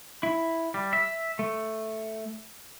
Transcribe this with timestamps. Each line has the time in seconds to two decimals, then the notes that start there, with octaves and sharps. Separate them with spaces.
0.23 E4
0.74 G3
0.93 E5
1.39 A3